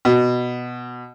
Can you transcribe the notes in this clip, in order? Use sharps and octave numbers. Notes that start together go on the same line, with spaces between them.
B2